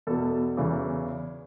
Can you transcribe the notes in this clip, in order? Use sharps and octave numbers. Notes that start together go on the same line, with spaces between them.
E2 B2 A4
E2 C#3 E3